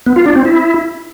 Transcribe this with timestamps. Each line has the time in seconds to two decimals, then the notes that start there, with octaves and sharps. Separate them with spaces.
0.06 B3
0.16 F4
0.26 D4
0.35 C4
0.45 E4